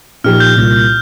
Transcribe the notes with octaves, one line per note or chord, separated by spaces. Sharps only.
A#2 F3 D#4 G4 F6
G6
C2 A#2 A#3 F4